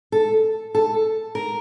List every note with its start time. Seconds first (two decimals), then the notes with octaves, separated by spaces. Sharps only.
0.12 A4
0.75 A4
1.35 A#4